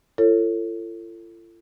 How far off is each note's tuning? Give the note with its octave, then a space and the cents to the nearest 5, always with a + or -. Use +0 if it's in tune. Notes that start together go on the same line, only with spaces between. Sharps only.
F4 -45 A4 +25 C#5 -20